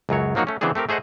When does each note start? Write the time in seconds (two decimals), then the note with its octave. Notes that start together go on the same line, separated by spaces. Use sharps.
0.09 C#2 F#2 F#3 C#5
0.35 F3 F#3 A#3 D#4 F#4
0.47 A3 C#4
0.61 C#3 E3 B3 C4 D4 G#4
0.75 A3 C4 G4 A#4
0.89 A3 G#4 C5 D#5 F#5